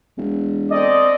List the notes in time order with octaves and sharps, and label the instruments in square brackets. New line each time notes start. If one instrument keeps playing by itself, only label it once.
[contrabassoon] E1
[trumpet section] C4 A4 D5 [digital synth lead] D#5